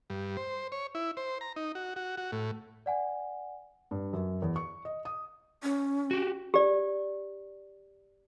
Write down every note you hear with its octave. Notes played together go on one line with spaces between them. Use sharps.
G2
C5
C#5
E4
C5
A#5
D#4
F#4
F#4
F#4
A2
D5 F#5 G#5
G2
F#2
E2
C#6
D#5
D#6
C#4
F#4 G4
G4 D5